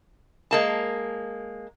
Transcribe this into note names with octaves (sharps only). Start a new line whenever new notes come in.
G#3 A#3 A5